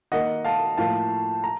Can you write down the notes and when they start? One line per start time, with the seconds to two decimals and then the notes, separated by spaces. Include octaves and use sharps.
0.12 D#3 A#3 D#5 F#5
0.45 F5 A5
0.77 A2 F3 A#3 F5 A5
1.44 A#5